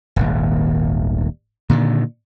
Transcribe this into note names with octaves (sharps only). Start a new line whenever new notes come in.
D#1 G#1 D#2
A#2 D3 D#3